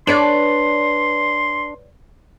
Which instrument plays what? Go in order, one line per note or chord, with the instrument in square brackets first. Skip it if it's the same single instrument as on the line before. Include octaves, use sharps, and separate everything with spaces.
[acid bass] D4 [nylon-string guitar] B4 C#5 D5 [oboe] C6